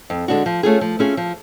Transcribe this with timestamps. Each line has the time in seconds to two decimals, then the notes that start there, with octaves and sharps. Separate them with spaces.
0.10 F2
0.28 D3 G#3 D4 F#4
0.46 F3
0.63 A3 C#4 F4 G#4
0.81 F3
0.99 A3 C#4 F4 G#4
1.17 F3